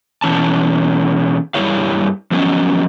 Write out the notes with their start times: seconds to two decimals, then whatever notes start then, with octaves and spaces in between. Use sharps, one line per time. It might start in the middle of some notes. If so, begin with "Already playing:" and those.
0.22 B2 E3 C#4 A5
1.54 G2 G3 E4 C#5 F5
2.31 F3 F#3 B3 C#4 D#5